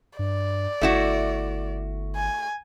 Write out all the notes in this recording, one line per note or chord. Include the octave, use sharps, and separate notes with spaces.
G2 D5
G1 A3 E4 F#4
G#5